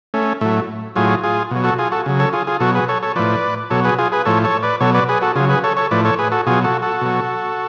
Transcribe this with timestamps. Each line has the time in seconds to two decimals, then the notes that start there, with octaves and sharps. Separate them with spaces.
0.14 A3 C#4
0.41 A2 F#3 A3
0.96 A2 F#3 F4 G#4
1.24 F4 G#4
1.51 B2 F#3
1.64 F#4 A4
1.78 F4 G#4
1.91 F#4 A4
2.06 C#3 F#3
2.19 A4 C#5
2.33 F4 G#4
2.47 F4 G#4
2.60 B2 F#3 F#4 A4
2.75 G#4 B4
2.88 A4 C#5
3.03 A4 C#5
3.16 A2 F3 B4 D5
3.70 B2 F#3 A4 C#5
3.85 G#4 B4
3.98 F4 G#4
4.12 G#4 B4
4.25 A2 F3 A4 C#5
4.44 A4 C#5
4.63 B4 D5
4.80 B2 F#3 A4 C#5
4.94 B4 D5
5.09 G#4 B4
5.22 F#4 A4
5.35 C#3 F#3 F4 G#4
5.49 G#4 B4
5.64 A4 C#5
5.77 A4 C#5
5.91 A2 F3 B4 D5
6.05 A4 C#5
6.19 G#4 B4
6.32 F#4 A4
6.47 B2 F#3 F4 G#4
6.64 F#4 A4
6.82 F#4 A4
7.01 B2 F#3